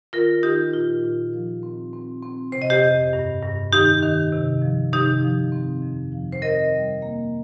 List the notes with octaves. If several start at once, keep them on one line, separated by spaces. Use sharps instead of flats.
D#3 F4 A#4
D#3 D#4 G4
A#2 F4
A#2
F3
C4
C4
C4
C3 C5
D#5
G4 C5
F2
G2
G2
D#3 D#4 G4
D#3
C3
F3
C3 D#4 G4
F3
C4
F2
F3
C5
C4 A#4 D#5
G3
A#3